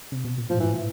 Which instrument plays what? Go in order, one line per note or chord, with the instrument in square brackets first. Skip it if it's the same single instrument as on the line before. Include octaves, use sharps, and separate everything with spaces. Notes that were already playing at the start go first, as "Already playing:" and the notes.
[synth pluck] C3
B2
A#2
[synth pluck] A2 [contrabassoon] F3
[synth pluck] G2
[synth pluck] G#2 [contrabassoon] E3